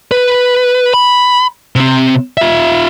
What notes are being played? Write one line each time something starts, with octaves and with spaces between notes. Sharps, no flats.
B4
B5
C3 C4
F4 E5